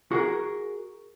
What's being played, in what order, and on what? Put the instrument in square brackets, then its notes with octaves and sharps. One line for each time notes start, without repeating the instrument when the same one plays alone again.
[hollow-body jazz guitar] F#4 G#4 A#4